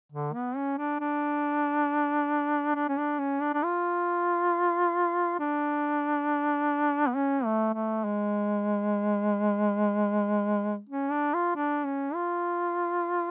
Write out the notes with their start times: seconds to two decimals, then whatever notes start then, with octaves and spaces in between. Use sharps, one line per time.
0.12 D3
0.34 B3
0.56 C#4
0.78 D4
1.00 D4
2.75 D4
2.89 C#4
2.98 D4
3.19 C#4
3.42 D4
3.54 D4
3.63 F4
5.40 D4
7.08 B3
7.16 C#4
7.45 A3
7.74 A3
8.04 G#3
10.89 C#4
11.11 D4
11.34 F4
11.56 D4
11.86 C#4
12.14 F4